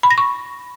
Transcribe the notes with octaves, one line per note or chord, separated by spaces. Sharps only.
B5
A#6
C#6